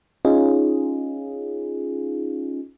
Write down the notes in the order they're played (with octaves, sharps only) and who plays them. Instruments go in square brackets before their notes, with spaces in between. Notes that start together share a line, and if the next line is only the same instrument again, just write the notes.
[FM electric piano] C#4 D#4 F4 G#4